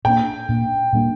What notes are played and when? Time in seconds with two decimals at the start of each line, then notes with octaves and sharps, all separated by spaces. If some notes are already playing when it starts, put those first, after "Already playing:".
0.05 A#2 A#3 D4 G5
0.49 A#2 A#3 D4
0.93 A#2 G3 A#3 D4